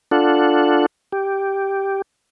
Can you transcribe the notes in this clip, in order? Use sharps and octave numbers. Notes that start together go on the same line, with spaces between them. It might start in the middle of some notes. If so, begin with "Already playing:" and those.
D4 F4 A4 F#5
G4